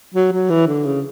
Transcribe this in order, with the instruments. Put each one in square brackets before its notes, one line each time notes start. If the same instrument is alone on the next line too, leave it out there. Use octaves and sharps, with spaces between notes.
[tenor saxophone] F#3
F#3
E3
D3
C#3